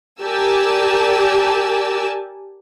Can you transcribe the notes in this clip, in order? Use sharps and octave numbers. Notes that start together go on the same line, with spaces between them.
G4 A#4 D5 G#5 A5 E6